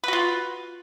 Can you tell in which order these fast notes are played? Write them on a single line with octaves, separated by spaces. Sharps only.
B4 F#4 F4